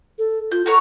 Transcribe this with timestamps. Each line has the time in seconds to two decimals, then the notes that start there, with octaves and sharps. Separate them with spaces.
0.18 A4
0.52 F4 G6
0.66 F#4 A4 A#4 C#5